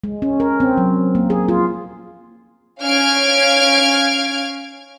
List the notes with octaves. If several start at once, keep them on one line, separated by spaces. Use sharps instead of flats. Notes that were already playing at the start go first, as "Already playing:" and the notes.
G#3
C#4
A#4
C4
F#3
A#3
G#4
F4
C#4 F5 F6 G#6 D7